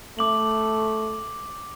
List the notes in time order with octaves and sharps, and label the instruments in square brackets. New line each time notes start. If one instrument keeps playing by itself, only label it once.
[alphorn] A3 [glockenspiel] D6 F#7